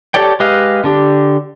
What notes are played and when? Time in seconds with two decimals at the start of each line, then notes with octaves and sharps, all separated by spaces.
0.14 G4 A4 C#5 D5 G5
0.40 G#3 G4 B4 D#5 F5
0.84 D3 D4 G4